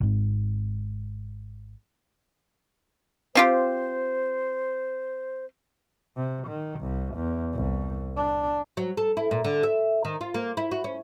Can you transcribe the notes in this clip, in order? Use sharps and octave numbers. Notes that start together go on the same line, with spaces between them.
G#1 G#2
C4 F4 G4 C5
C3
D#3
C2
E2
C2
D4
F#3
A4
E4
A#2
D3
E5
D#3
F4
A#3
E4
F#4
C#4